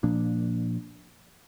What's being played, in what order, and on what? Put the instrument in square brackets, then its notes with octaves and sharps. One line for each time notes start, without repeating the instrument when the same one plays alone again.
[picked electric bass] A#2 F3 A#3 D4